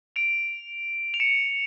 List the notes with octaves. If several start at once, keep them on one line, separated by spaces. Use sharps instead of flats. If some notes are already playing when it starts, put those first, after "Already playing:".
D7 F7
F7
C#7 E7